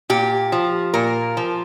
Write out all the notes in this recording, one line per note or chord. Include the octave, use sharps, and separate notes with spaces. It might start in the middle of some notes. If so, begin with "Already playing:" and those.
A#2 G4
F3
A#2 A#4
F3